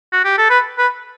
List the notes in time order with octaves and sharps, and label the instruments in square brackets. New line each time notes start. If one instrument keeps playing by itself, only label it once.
[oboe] F#4
G4
A4
B4
B4